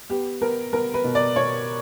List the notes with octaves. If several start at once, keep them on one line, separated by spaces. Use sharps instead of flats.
B3 G4
B3 A#4
B3 A#4
B4
B2
D5
B2 C#5